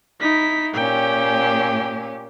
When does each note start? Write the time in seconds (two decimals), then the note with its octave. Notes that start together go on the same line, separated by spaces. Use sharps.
0.21 D#4 E4 B6
0.74 A#2 C#4 G4 G5